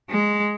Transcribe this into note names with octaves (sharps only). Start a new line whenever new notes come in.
G#3